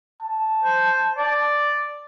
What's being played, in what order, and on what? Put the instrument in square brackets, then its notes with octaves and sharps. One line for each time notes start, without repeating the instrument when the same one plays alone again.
[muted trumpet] A5
[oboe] C5
D5